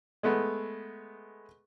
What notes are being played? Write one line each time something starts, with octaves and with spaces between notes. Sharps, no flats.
G#3 A3 B3